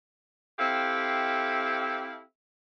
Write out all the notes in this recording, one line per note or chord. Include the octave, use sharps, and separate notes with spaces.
C4 E4 G4 A4 E5 F5